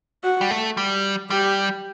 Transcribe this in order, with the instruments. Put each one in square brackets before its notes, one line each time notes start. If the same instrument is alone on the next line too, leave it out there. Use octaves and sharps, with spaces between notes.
[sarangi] F#4
[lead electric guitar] G3
A3
G3
[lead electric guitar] G3 [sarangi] G4